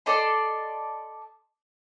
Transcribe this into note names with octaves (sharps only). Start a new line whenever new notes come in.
A4 D5 D#5 C6